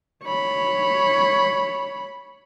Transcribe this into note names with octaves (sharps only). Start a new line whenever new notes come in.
C#5 B5